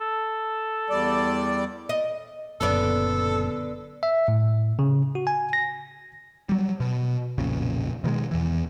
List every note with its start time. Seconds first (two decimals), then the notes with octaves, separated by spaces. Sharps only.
0.01 A4
0.90 E2 G3 D5
1.89 D#5
2.61 F#1 F#2 A#2 D3 B3 A4 D5
4.03 E5
4.28 A2
4.79 C#3
5.15 F#4
5.27 G#5
5.53 A#6
6.49 F#3 G3
6.80 B2
7.38 B1 F2 A#2 C#3
8.04 B2 D#3 F#3 G#3
8.31 E2 E3